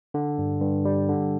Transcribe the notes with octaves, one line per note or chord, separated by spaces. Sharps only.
D3
G2
G2
G3
D3